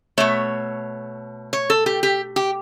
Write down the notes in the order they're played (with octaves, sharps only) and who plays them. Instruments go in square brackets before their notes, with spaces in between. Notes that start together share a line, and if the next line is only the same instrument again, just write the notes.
[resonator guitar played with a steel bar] B2 A3 C#5
C#5
A4
G4
G4
G4